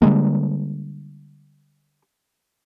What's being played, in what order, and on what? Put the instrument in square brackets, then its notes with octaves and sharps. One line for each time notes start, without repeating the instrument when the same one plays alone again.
[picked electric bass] D3 G3 G#3 A#3